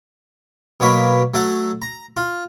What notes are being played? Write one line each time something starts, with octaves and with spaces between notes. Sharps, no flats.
B2 F#3 A#3 C#5 B5
F#3 A3 A4 F#5
A#5
F4